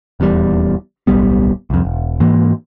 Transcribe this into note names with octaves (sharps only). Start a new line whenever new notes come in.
D#1 E2 A#2 G3
D1 B1 G3 B3
C2 F2
E1
G#2 E3 A#3